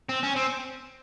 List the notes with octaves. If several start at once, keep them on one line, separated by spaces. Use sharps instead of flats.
C4
C#4
C4